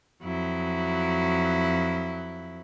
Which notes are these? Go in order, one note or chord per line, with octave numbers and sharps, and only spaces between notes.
F2 F#3 E4